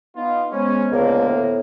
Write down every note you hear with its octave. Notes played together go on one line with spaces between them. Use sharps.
B3 D#4 F4
G#3 B3 C#4 C5
C#2 D3 A#3
A2